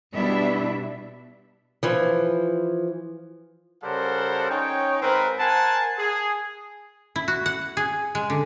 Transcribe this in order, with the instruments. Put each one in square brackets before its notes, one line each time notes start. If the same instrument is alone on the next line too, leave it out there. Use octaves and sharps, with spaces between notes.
[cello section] B2 G3 B3 D4 E4 E5
[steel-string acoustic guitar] E3 F3
[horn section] C#3 G3 A4 A#4 C5 F#5
C#4 D#4 C#5 G5
G#2 C4 A#4 B4
A#4 C5 F#5 G#5 A5
G#4
[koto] E4
F#4
F#5
G#4
G#3
D3